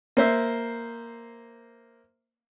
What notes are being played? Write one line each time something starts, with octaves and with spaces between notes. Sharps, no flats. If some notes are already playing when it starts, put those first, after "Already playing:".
A#3 C5 E5